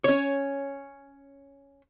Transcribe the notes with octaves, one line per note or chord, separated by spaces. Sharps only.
C#4 C#5